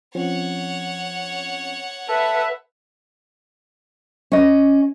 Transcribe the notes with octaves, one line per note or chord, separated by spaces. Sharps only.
F3 C4 C#4 C#5 F#5
A4 B4 E5
C#4 D#5